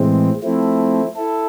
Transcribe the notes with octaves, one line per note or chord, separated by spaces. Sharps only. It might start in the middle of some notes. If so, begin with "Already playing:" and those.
Already playing: A2 E3 G#3 C4
F3 A3 C4 E4
E4 A4